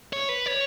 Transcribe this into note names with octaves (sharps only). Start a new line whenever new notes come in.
C#5
B4
C#5